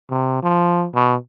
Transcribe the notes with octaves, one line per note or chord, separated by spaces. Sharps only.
C3
F3
B2